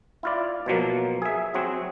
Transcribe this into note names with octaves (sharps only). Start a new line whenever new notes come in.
E4 F4 D5
B2 F3 F#3 A#3
G#4 E5
F#3 C4 F#4 G#4